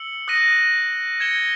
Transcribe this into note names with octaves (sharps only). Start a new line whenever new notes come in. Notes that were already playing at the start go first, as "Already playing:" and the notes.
Already playing: E6 C#7 F#7
D#6 F#6 A#6 D#7
G#6 C#7 E7 G7